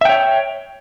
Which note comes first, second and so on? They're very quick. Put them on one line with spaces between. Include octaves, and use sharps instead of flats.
E5 G5 C#5